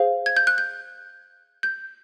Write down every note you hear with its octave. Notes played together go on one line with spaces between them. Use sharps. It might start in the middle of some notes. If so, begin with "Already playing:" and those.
Already playing: G#4 C5 F5
G#6
G6
F#6
G6
G6